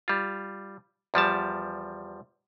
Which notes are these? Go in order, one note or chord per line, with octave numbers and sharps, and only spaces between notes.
G3 F4
E2 F3 G3 A5